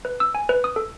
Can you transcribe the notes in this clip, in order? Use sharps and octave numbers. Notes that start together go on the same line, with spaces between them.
B4
E6
G#5
B4
D#6
A4